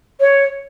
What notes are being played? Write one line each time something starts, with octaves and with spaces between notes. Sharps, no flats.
C#5